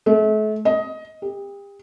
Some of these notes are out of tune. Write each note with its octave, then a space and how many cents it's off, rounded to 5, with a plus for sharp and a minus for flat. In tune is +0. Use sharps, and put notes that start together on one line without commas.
A3 -40
D#5 +15
G4 +35